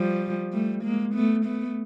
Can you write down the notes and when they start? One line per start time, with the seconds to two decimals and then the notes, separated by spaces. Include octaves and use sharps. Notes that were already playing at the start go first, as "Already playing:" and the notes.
Already playing: F3 G3
0.53 G3 A3
0.83 G#3 A#3
1.14 A3 B3
1.45 A3 B3